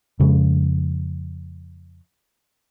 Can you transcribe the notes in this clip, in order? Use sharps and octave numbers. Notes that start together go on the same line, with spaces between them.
F2 C#3 G#3